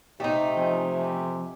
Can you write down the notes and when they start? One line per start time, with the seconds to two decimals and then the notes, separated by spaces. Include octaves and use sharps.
0.20 C3 A3 D#4 G4 D#5 F#5
0.57 F3 C4 E5 G5 G#5